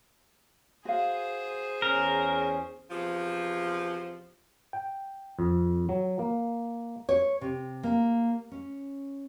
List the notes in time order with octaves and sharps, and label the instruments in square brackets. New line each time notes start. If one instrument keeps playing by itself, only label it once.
[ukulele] F#4 F5 [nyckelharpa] G#4 C5
[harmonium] E2 C#4 [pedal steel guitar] A#4
[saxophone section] E2 C3 F3
[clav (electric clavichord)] G5
F2
F#3
A#3
[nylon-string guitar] C#5
C3
A#3
C#4